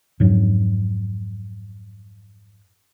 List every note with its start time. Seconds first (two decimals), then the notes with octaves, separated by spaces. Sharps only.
0.20 F2 G#2 F#3